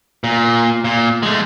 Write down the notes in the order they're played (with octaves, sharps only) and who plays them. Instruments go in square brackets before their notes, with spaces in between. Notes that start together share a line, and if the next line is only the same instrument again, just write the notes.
[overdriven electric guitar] A#2
A#2
G#3 A3